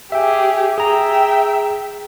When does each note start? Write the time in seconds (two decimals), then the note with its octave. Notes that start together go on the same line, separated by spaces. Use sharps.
0.12 G4 G#4 E5 G5
0.78 G#4 E5 G5 A#5